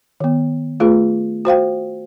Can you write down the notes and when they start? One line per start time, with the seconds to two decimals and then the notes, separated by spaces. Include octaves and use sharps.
0.20 D#3 B3
0.80 A3 F4 G#4 B4
1.45 F#4 C5 F5 G5